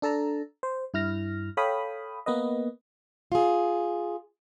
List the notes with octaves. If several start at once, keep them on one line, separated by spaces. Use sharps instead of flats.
D4 A4 A5 A#5
C5
G2 E4 F6 A#6
A4 C#5 F5 G5 B5 D#6
A#3 B3 B4 D#5
F4 G#4